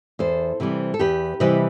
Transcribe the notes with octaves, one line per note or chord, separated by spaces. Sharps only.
E2 A4 C5
C3 E3 G3
A4
E2 G4 B4
C3 E3 G3 B4 D#5